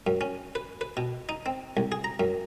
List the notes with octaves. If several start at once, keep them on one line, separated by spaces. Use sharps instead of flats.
F#2
C#4
B4
B4
B2
D#4
C4
C2
G#4
A#5
F#2